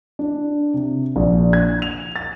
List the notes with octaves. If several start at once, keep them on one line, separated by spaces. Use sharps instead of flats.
D4
C3
A#1
G#6
F7
A6